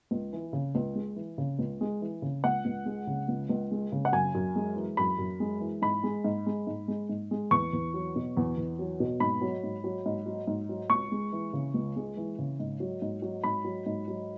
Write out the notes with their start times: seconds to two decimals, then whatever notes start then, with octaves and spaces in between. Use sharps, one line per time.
0.11 C#2
0.33 E3
0.53 C#3
0.75 C#2
0.95 G#3
1.16 E3
1.38 C#3
1.59 C#2
1.81 G#3
2.01 E3
2.22 C#3
2.44 C#2 F#5
2.65 C#2
2.86 G#3
3.07 C#3
3.28 C#2
3.49 C#2
3.71 G#3
3.92 C#3
4.05 F#5
4.12 F#2 G#5
4.35 F#2
4.55 G#3
4.76 E3
4.97 F#2 B5
5.19 F#2
5.40 G#3
5.61 E3
5.82 G#2 B5
6.03 G#3
6.24 G#2
6.46 G#3
6.67 G#2
6.88 G#3
7.09 G#2
7.31 G#3
7.51 E2 C#6
7.73 E2
7.94 F#3
8.16 B2
8.37 E2
8.57 E2
8.79 F#3
9.00 B2
9.20 G#2 B5
9.41 F#3
9.64 G#2
9.84 F#3
10.06 G#2
10.26 F#3
10.47 G#2
10.69 F#3
10.89 C#2 C#6
11.12 G#3
11.32 E3
11.53 C#3
11.74 C#2
11.96 G#3
12.17 E3
12.38 C#3
12.60 G#2
12.80 F#3
13.02 G#2
13.22 F#3
13.44 G#2 B5
13.65 F#3
13.86 G#2
14.08 F#3